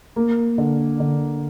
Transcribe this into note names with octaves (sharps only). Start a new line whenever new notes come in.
A#3
D3
D3